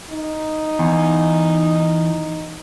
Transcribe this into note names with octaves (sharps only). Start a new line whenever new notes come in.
D#4
E2